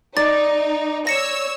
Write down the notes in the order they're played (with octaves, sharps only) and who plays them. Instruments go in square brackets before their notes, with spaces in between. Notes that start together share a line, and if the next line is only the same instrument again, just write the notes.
[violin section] D#4 [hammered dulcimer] D5 [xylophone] A6
[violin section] C#5 E6 [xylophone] A#6 C#7 E7